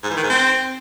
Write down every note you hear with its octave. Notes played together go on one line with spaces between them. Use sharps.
G#2
E3
D#3
G#2
C4